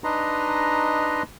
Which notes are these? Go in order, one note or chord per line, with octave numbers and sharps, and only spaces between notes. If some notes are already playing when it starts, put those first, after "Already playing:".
D4 D#4 B4 D#5 A#5 C6